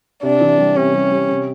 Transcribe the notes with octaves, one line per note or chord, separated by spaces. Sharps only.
C3 D4
E3
G3
C3 C#4
G3
G3
C3